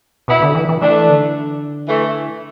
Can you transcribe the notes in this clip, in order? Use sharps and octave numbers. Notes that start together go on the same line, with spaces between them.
B2 B3 E4
D3
E3
E3
E3 A3 D4
D3
E3 A3